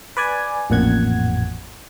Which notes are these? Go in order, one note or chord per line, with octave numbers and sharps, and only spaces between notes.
B4 D5 G#5
A1 F2 A#2 F#5 G#6